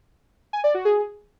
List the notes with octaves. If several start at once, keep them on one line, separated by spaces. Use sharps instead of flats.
G#5
D5
F#4
G#4